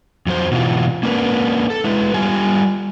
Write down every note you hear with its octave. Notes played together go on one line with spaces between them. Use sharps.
F2 F#3 C5
B2 E3 F4
A#3 C#4 D4 A#4 B4
A4
G#3 E4 B4
G3 F4 G#5